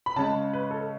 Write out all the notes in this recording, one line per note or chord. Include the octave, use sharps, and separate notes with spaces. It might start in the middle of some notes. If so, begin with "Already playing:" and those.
B5
C#3 G#3 C#4 A5
B4
A4